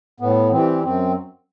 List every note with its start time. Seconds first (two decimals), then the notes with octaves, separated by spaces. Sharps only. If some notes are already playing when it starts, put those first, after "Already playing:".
0.20 A2 B3
0.52 E3 G3 C4
0.83 F#2 C4